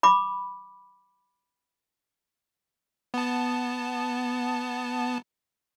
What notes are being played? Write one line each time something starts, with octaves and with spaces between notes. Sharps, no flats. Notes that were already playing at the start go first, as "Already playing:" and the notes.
B5 D6
B3 A5